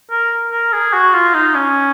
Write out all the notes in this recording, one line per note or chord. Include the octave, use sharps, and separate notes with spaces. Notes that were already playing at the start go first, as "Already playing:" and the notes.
A#4
A#4
G#4
F#4
F4
D#4
C#4